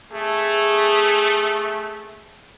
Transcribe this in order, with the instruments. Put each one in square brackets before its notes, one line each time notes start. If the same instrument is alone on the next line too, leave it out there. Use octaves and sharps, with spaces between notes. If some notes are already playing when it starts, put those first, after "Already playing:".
[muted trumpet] A3 [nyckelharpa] G#4